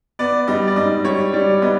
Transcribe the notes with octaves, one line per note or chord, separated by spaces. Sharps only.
B3 D5
G3 D#5
D5
G#2 D#5
G3 C#5
G3 D5
B3 D#5